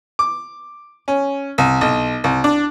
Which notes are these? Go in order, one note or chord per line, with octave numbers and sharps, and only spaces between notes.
D6
C#4
C2
B1
C2
D4